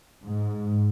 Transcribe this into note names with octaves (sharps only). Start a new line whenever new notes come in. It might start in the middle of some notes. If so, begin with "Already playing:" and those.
G#2